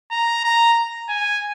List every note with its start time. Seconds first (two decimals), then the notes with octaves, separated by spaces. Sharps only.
0.11 A#5
0.44 A#5
1.09 G#5